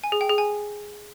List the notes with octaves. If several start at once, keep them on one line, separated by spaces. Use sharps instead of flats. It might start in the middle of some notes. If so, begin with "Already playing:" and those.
G#5
G#4
G5
G#4
G#5